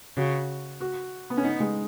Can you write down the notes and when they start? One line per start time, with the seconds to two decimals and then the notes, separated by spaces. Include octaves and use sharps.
0.17 C#3 F#4
0.81 F#4
1.30 B3
1.37 C#4
1.44 B3 D#4
1.60 G#3